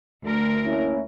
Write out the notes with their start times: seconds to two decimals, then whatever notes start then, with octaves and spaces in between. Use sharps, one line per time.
0.22 D2 A#4
0.65 A#3 C#4 E4